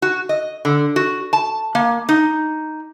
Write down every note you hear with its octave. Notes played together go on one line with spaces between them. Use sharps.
F#4
D#5
D3
F#4
A5
A#3
D#4